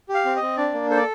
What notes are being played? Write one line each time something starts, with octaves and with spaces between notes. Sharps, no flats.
G4
F5
C4
D#5
C4
D4 D5
A#3
A4 C5
D5